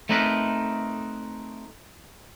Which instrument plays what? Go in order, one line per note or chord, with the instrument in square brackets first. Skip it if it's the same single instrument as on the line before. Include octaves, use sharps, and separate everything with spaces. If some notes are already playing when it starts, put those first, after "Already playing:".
[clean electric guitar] A3 C4 D#4 A#4 B4